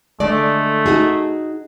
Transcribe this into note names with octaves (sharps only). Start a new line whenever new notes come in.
D3 G#3 A3 D5
D#4 F#4 G#4